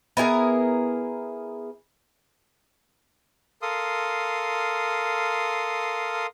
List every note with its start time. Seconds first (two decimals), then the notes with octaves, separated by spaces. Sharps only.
0.17 B3 E4 G#4 A#4
3.62 A4 A#4 F5 C6 D#6